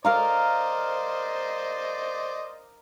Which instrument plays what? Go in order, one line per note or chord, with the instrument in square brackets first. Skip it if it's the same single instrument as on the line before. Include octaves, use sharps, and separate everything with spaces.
[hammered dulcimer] A#4 F5 A#5 [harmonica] C5 D5 D#5